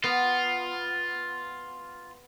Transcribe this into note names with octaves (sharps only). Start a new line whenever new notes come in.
B3 F4